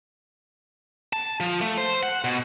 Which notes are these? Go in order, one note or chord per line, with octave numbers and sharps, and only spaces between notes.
A5
F3
A3
C5
F#5
B2